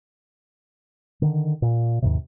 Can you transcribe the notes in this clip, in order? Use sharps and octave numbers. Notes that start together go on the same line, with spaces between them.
D3 D#3
A#2
D#2 G#2 C3